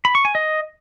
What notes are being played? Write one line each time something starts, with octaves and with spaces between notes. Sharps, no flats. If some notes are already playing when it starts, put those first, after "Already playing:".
B5
C#6
G#5
D#5